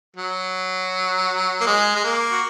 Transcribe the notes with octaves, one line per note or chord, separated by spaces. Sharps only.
F#3
A#3
G#3
G#3
A#3
F#4